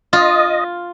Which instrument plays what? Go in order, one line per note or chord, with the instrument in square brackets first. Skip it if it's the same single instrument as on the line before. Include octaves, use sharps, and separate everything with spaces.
[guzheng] F4 [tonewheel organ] D#5